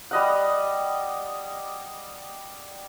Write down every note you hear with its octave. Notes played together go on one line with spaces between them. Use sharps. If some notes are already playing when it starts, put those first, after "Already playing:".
G3 D#5 F#5